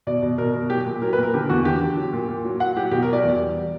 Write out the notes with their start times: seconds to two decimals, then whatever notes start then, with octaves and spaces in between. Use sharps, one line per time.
0.07 B2 D5
0.23 B2
0.38 B2 A#4
0.54 B2
0.69 F#3 G4
0.86 A#2
1.02 F#3 A#4
1.13 B4
1.17 A#2
1.23 A#4
1.34 D3 G4
1.49 E2 F#4
1.65 D3 G4
1.81 D3
1.97 F#3
2.13 A#2
2.29 A#2
2.45 F#3
2.60 F#3 F#5
2.76 F#3 G4
2.91 B2 G4
3.03 A#4
3.08 F#3 D5
3.24 E2
3.40 G3